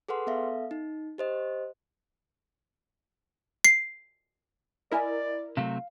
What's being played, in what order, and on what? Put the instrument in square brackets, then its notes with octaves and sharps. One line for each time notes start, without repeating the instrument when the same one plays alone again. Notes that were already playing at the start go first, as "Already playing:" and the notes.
[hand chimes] G#4 A4 B4 F#5 C6
B3 A4 E5 F5
D#4
G4 C5 D#5
[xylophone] C7
[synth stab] E4 A#4 [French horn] D5 [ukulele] D#5 G#5
[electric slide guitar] C3 F#3 A3 [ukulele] F5